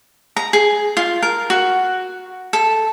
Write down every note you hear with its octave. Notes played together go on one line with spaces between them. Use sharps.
A#5
G#4
F4
A#4
F#4
A4